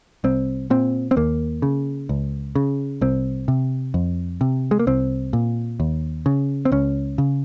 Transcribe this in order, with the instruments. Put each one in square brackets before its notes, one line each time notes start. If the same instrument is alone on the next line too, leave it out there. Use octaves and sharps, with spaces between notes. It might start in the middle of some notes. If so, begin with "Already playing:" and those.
[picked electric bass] C2 C4
A#2 C4
C4
D#2 A#3
C#3
C#2
C#3
C2 C4
C3
F2
C3
G#3
A#3
C2 C4
A#2
D#2
C#3
C4
C#2 C#4
C#3